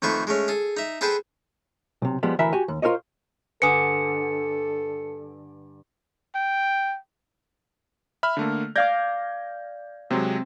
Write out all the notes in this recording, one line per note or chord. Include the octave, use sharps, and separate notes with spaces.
F2 D#3 A3 B4 C5 C#6
G#3 A3 C#4
G#4 A4
D#4 E5
G#4 A4 B4 C5 G5 A5
B1 C3
F3 G3 G#3 B3
D2 E3 A#4 E5 B5
F#4 G4 G#5
D#2
F4 A#4 C5 C#5 D#5
G2 D3 A4 B4 G#5 D#6 C#7
G5
E5 B5 F6
D3 A3 A#3
D5 F5 D6 G6 G#6 A#6
C3 F#3 G#3 C4